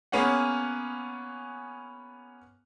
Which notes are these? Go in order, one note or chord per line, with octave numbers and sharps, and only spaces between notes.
A#3 B3 C#4 G#4 F#5